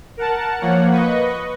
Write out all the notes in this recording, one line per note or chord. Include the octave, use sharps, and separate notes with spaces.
A#4 F#5 A5
F3 A#3 C#5 F#5
B4 D#5 C#6